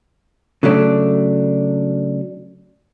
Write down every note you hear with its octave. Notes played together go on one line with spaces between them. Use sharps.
C#3 F#3 A3 D4